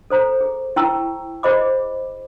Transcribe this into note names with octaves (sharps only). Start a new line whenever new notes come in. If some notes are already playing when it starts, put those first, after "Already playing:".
A4 C5 A#5
G#4
E4 G5 A5 A#5 C#6 E6
G#4 C5 D#5 B5 D6